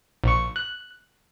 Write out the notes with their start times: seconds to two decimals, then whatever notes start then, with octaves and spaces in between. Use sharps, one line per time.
0.24 A#1 C#6
0.56 F#6